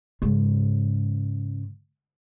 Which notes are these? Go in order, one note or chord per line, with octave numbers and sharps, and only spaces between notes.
G#2 C#3